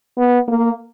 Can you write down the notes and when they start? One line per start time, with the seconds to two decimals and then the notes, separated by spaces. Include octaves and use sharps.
0.18 B3
0.48 A#3